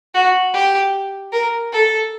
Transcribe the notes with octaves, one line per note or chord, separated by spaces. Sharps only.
F#4
G4
A#4
A4